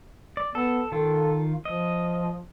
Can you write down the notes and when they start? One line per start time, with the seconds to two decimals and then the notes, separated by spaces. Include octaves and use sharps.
0.37 D5
0.55 B3 A4
0.92 D#3 F4 A4
1.65 F3 D#5